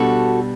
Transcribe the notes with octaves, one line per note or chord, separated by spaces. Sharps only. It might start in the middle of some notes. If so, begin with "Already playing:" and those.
Already playing: B2 G3 D4 F#4 A4